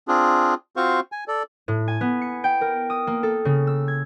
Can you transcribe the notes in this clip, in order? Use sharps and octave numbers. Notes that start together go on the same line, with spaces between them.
C4 D4 F4 G#4
C4 F4 F#4 C5 F5 C#6
G#5
A4 D5
A2
G#5
B3
C#7
G5
A#4
D#6
A#3
A4
C#3
E6
G#6